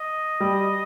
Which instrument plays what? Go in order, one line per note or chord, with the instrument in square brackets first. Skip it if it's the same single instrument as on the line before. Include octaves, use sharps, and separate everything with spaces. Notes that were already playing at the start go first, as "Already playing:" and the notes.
Already playing: [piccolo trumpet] D#5
[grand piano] G3